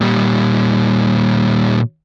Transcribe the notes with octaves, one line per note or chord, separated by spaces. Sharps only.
A#2 G3